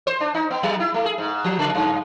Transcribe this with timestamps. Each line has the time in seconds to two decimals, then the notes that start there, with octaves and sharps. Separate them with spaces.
0.07 C5
0.20 D4
0.35 D#4
0.50 B3
0.63 F#3
0.80 E4
0.94 A3
1.05 G#4
1.18 G#2
1.44 F3
1.59 C#3
1.75 G2